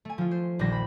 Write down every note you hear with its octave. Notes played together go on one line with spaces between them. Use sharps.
A3 G#5
F3 F4
C5
D#1 A#1 G3 C5 A#6
B5